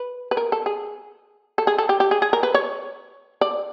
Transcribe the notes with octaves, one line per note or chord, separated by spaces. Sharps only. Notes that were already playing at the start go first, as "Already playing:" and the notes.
Already playing: B4
B4
A#4
A4
G#4
A4
G#4
A4
G4
G4
G#4
G#4
A#4
B4
C#5
D5